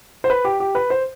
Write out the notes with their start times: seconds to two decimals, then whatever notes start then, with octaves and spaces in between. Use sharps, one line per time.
0.24 C5
0.30 B4
0.45 G4
0.60 G4
0.75 B4
0.90 C5